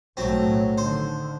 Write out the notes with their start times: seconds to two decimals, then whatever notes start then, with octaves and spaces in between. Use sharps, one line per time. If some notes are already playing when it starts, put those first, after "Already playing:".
0.17 B1 A2 F#3 A3 C4
0.78 D3 D#3 C5